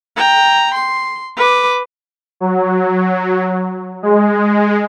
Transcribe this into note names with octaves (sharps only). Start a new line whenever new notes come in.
G5 A#5
C6
B4 D6
F#3
G#3